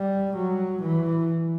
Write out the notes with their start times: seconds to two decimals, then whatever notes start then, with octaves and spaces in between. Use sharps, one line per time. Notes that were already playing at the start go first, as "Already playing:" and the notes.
Already playing: G3
0.36 F#3
0.82 E3